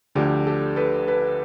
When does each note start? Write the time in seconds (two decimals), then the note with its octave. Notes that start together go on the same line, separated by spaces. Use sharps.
0.15 D2 D3 F3 G4
0.47 G4 A4
0.76 A4 B4
1.07 A4 B4